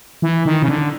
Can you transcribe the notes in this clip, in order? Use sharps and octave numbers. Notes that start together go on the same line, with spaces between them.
E3
D#3
C#3
D3